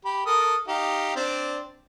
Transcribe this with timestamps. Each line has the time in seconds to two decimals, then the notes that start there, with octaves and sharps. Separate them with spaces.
0.05 G4 B5
0.26 A4 A#4 D#6
0.68 D#4 G4 F5
1.16 C4 D4 D5